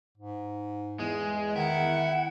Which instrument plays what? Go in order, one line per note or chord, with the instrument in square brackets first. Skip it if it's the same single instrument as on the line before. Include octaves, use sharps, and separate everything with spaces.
[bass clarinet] G#2
[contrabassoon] E2 [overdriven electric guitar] G#3
[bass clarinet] D#3 [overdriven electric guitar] E4 [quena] F#5